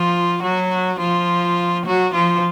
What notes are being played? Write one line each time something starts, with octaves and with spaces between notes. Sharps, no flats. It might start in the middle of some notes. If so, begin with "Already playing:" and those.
Already playing: F3 F4
F#3 F#4
F3 F4
F#3 F#4
F3 F4